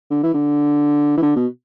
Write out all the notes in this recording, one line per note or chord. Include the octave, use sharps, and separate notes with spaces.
D3
E3
D3
E3
D3
B2